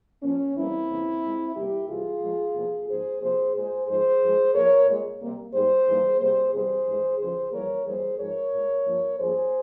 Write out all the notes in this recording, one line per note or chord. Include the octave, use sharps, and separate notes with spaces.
A#2 F3 A#3 C#4
E2 E3 G3 A#3 C4 E4
F2 C#3 E3 A#3
A#2 G#3
E2 C3 G3 A#3 E4 G4
C3 E3 G3 F4 G#4
A#2 F3 G#3
E2 C3 F3 A#3
G#2 F3 A#3 G#4 C5
C3 F3 A#3 G#4 C5
A#2 G#3 G#4 C5
G#2 F3 G#3 G#4 C5
G2 F3 G#3
A#2 F3 A#3 A#4 C#5
A#2 G#3
C3 G3 A#3
G#2 G3 A#3 G#4 C5
G#2 E3 G3 A#3
C3 G3 A#3 G#4 C5
E2 C3 G3 G#4 C5
G2 E3 G#3
E2 C#3 F3 G#4 C5
F2 E3 G3 A#3 A#4 C#5
F2 E3 G3 A#3 G#4 C5
G#2 F3 G#3 A#4 C#5
A#2 G#3
G2 F3 A#3
G2 F3 A#3 G#4 C5